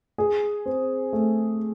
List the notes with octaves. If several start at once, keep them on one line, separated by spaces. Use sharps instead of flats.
G#4
C4
A3